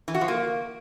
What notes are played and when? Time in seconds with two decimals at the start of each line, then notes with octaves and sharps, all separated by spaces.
0.08 E3
0.15 F#4
0.21 F3
0.28 A#3